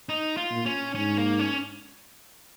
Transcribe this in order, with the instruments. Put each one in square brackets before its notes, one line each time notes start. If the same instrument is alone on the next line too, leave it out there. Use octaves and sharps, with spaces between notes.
[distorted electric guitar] D#4
F4
[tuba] A#2
[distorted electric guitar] C#4
[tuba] G#2 [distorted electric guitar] C#4
[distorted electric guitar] A#3
C#4